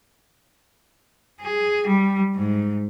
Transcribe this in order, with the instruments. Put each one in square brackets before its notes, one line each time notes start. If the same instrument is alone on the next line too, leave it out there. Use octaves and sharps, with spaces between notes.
[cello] G#4
G3
G#2